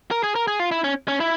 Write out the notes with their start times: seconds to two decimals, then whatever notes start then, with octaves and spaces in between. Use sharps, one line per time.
0.11 A#4
0.23 G#4
0.35 A#4
0.48 G#4
0.59 F4
0.72 E4
0.84 C#4
1.08 C#4
1.20 E4